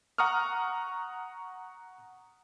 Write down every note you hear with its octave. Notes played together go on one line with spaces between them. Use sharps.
F#5 A#5 C#6 D#6 F6